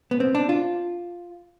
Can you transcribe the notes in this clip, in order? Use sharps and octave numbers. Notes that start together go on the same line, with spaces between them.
B3
C4
D4
F4